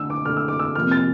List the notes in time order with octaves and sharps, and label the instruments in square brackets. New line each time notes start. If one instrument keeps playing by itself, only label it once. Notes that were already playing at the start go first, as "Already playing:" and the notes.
Already playing: [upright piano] D3 A3 E6
D6
D3 A3 F6
E6
D6
E6
C3 F3 A#3 F6
A6